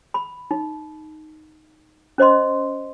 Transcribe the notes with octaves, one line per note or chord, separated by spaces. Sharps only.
B5
D#4
C#4 C5 D#5 C6